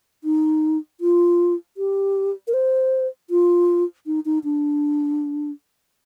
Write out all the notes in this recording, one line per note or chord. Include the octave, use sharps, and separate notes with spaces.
D#4
F4
G4
A#4
C5
F4
D#4
D#4
D4